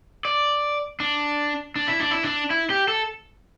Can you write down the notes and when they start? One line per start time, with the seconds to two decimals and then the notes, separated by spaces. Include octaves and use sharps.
0.25 D5
1.00 D4
1.76 D4
1.88 E4
2.00 D4
2.11 E4
2.24 D4
2.50 E4
2.70 G4
2.88 A4